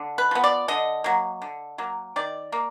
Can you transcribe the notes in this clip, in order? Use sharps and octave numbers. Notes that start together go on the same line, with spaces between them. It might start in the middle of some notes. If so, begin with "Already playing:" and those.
Already playing: D3
B4
F3 B3
D5
D3 D#5
F#3 A#3
D3
F#3 A#3
D#3 D5
A#3